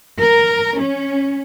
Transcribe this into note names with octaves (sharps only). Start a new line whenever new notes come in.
A#4
C#4